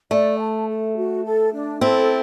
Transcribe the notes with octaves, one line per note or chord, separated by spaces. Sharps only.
A3 D5
A5
A4
F#4
A4
D4
C4 E4 A4